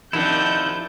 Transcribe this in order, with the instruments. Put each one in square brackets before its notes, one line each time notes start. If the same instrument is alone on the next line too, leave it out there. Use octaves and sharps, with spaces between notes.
[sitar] C3 D#3 F3 [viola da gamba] D4 [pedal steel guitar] E4 F#5 [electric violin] G6